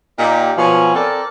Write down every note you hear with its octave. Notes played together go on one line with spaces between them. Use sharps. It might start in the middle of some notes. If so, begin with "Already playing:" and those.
A#2 D#4 G4
B2 F3 C#5 G#5
C4 A4 A#4 D5